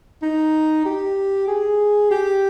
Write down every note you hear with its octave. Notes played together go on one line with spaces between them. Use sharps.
D#4
G4
G#4
G4